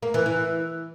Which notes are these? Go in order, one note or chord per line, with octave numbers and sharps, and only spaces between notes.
A#3
E3
E3